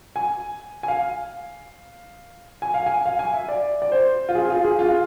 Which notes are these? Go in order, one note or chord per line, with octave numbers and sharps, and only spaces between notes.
G#5
G#5
F5
G#5
F5
G#5
F5
G#5
E5
D5
D5
C5
F4
G#4
G#4
F4
G#4
F4